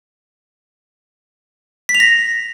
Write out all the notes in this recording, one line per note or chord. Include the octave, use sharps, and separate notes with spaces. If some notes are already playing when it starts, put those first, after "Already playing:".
B6
F7
A#6